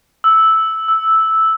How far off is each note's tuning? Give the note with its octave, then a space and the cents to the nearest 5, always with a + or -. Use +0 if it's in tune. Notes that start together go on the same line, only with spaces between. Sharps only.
E6 -10
E6 -5